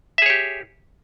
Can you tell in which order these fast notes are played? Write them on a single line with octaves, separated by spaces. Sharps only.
E5 G#4 C#5 G4